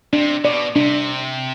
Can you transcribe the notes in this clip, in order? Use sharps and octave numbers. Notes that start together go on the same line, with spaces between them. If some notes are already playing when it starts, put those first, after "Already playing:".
C3 D4
B2 D5
C3 D4